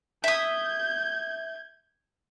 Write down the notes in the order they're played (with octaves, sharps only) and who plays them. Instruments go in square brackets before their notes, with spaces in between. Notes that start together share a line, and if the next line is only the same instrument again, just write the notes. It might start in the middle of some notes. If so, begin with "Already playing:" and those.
[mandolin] E5 D#6 [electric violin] G6 G#6